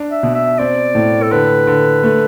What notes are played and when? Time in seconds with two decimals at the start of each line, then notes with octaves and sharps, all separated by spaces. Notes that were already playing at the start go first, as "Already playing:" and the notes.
Already playing: D4
0.11 E5
0.23 B2
0.35 E5
0.59 C4 D5
0.95 A2
1.23 A4
1.31 D3 B4
1.67 D3
2.04 A3